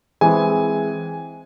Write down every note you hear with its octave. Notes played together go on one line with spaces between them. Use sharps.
E3 G#3 C4 G#5